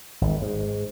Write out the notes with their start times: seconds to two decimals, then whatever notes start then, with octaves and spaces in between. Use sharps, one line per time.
0.21 G#1
0.42 G#2